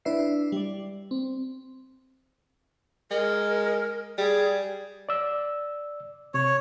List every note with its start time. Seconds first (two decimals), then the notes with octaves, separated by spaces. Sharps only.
0.05 D4 E4 B4 D5 E5 C7
0.52 G3 D5
1.11 C4
3.11 G#3 A#4
4.18 G3 G#4
5.09 D5 E6
6.34 C3 C#5